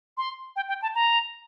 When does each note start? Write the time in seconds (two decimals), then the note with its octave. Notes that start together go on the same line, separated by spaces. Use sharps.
0.18 C6
0.56 G5
0.68 G5
0.82 A5
0.95 A#5